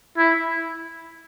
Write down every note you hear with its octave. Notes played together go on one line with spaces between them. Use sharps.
E4